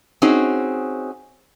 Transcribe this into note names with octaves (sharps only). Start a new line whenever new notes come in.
C4 C#4 D#4 F#4 G#4